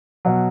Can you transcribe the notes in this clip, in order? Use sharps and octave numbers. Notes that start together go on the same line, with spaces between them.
B2 F#3